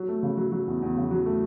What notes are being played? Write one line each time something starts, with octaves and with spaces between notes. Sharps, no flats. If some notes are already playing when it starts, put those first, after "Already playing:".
Already playing: F#3
A3
C#3
F#3
F#3
E2
E2
C#3
F#3
A3